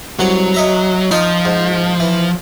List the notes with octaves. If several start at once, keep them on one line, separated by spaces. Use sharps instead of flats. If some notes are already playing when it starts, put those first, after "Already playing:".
C2 F#3 F#4
D#5 E5 A#5
F3 D#4 F4 C6
G#2
E3